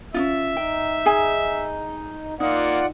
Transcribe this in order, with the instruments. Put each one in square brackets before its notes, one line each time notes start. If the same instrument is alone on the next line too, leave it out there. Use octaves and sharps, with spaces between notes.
[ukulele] C#4 D#4 F4 [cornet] E5
[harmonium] D#4 [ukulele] G5
[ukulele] G#4 G#5
[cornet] A#3 [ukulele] D#4 [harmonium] F4 D5 F#5